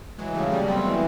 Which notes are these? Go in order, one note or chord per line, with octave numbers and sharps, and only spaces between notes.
E3 F#3 G#3
C#3 G3 A3
G3 G#3 A#3
B3 C4
E3 A#3